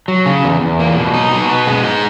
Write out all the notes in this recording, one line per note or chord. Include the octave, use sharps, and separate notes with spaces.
F#3
C#3
E2
E2
A#3
B2
D#4
B2
B3
G#3
D#4